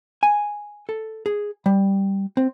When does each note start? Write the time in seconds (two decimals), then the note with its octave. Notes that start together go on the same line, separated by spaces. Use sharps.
0.23 G#5
0.89 A4
1.26 G#4
1.66 G3
2.37 C4